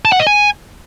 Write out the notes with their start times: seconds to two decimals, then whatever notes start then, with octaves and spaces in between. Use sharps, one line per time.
0.05 A5
0.12 F#5
0.19 D#5
0.27 G#5